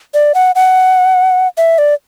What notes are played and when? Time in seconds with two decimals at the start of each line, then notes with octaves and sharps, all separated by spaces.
0.14 D5
0.35 F#5
0.55 F#5
1.58 E5
1.78 D5